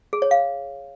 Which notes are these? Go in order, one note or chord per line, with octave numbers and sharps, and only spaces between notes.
G#4
C#5
F5